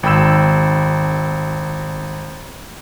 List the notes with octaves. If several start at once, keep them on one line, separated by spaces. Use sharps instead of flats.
G#1 G5 B5 E6 E7